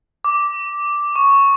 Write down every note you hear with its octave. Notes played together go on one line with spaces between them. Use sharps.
D6
C#6